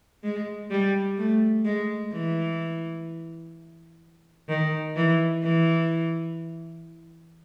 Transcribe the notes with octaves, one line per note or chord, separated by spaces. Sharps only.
G#3
G3
A3
G#3
E3
D#3
E3
E3